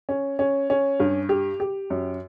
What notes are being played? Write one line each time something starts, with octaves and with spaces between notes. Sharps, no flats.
C#4
C#4
C#4
G2
G4
G4
F#2